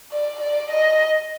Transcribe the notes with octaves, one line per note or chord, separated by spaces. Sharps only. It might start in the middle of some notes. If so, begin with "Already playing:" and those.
D5
D5
D#5